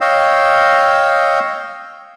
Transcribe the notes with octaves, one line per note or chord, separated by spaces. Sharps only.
C#5 D#5 F5 G5 E6